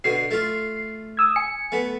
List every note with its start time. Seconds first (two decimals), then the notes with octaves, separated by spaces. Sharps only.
0.04 B2 D3 C7
0.31 A3 F4
1.17 D#6 E6 G#6
1.36 G#5 C#7
1.72 A3 B3